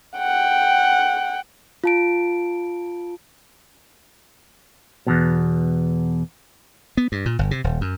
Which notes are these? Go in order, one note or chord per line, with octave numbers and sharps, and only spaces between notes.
F#5 G5
F4 A5 D7
E2 G2 B2
B3
G2
A#2
G1
C3
D#1
F#2